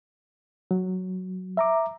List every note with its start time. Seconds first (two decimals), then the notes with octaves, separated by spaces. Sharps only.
0.71 F#3
1.57 E5 A#5 D6